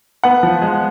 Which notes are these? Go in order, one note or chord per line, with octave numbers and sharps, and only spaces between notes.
B3 F#5
F3
G#3